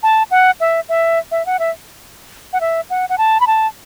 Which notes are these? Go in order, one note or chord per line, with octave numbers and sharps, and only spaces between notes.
A5
F#5
E5
E5
E5
F#5
E5
F#5
E5
F#5
F#5
A5
B5
A5